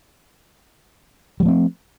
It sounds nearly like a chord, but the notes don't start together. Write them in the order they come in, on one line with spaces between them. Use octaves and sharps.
G3 F3 A3 C4